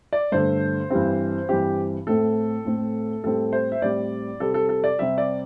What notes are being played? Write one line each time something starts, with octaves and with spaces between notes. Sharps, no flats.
D5
G2 D3 A3 C5
G2 E3 G3 C4
G2 E3 G3 C4 G4
A2 A3 C4 A4
A2 A3 C4
A2 G3 C4 A4
C5
E5
A2 G3 C4 D5
C3 G3 C4 A4
A4
A4
D5
C3 G3 C4 E5
D5